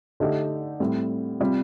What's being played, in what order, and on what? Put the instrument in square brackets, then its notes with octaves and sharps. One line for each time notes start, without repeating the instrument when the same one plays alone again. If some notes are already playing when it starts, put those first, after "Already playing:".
[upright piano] D3 A3 D#4 G4
A2 G3 C4
C3 G3 C4 F4